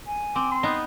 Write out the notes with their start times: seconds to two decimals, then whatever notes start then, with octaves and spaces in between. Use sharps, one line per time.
0.07 G#5
0.36 C4 D6
0.52 C6
0.63 B3 D#4